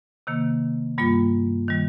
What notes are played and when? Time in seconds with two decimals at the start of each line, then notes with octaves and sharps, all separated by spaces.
0.27 C3 D#3 A#3
0.98 G2 G3 A#3 F4
1.68 D#3 G3